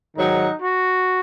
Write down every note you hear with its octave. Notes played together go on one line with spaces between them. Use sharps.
G#2 D#3 F#3 D#4
F#4